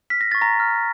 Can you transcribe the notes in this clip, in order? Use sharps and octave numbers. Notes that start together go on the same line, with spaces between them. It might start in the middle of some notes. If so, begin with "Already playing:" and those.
F6 B6
A#6
C#6 A6
A#5 A#6
F6